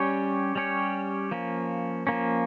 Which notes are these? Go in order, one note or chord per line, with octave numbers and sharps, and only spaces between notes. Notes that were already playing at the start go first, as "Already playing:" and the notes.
Already playing: G3 C#4 G4 C#5
G3 C#4 G4 C#5
F3 A#3 C#4
F3 A#3 C#4